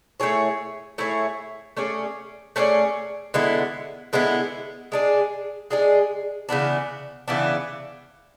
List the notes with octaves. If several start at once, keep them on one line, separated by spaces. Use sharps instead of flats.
A3 E4 G#4 C#5
A3 E4 G#4 C#5
A3 C#4 G#4 D5
A3 C#4 G#4 D5
D3 G#3 B3 E4
D3 G#3 B3 E4
G#3 D4 G#4
G#3 D4 G#4
C#3 E3 B3 D4
C#3 E3 B3 D4